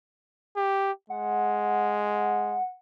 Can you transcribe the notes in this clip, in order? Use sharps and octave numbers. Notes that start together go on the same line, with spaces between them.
G4
G#3 F#5